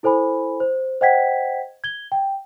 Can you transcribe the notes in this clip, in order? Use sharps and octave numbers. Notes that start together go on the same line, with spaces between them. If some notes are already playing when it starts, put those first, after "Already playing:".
E4 A4 C5 G#5 B5
C5
C5 D#5 F#5 G5 G#6 B6
G#6 G7
G5